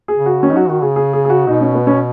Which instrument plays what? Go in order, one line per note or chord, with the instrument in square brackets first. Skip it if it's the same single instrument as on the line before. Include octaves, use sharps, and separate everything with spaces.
[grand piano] G#4
[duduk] C#3
[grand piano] F#4
[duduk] D#3 [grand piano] C#4
[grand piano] D#4
[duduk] F#3 [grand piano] F#4
[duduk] D#3 [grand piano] F#4
[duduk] C#3 [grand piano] G#4
[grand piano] G#4
G#4
G#4
F#4
[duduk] B2 [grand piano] D#4
[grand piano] C#4
B3
C#4